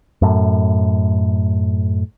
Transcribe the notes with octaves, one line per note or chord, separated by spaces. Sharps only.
F#2 A2